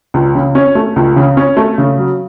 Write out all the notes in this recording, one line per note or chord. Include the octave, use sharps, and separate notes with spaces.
C#2
C#3
C#4
A3
C#2
C#3
C#4
A3
C#3
F#3